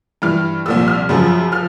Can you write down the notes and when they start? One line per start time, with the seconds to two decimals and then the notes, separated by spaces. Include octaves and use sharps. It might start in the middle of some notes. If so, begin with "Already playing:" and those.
0.22 G2 E3 F6
0.66 C2 A#2 F3 E6
0.88 F6
1.09 F#2 C#3 F3
1.52 F3 F6